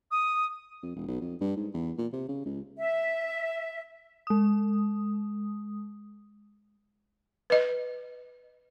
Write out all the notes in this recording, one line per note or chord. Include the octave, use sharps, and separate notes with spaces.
D#6
F2
E1
B1
F2
G2
G#2
E2
A#2
C3
C#3
C#2
E5
G#3 D#6
B4 D#5